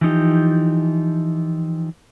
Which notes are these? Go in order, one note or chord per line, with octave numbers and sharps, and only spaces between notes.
E3 F3 D#4 G4